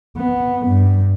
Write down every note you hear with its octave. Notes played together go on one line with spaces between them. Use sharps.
B3
G2